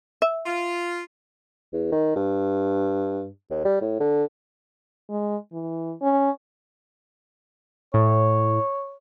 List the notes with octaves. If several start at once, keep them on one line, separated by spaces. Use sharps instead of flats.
E5
F4
E2
D#3
G2
D#2
G3
A2
D3
G#3
E3
C#4
A2 C#5